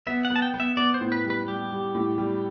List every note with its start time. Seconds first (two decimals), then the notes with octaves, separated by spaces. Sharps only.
0.07 B3 E5
0.25 F#5
0.30 B3
0.36 A5
0.42 G5
0.54 B3
0.60 E5
0.77 B3 D5
0.94 C5
1.01 A2
1.12 B4
1.24 G3
1.30 B4
1.48 G3 G4
1.71 G3
1.95 A2
2.18 G3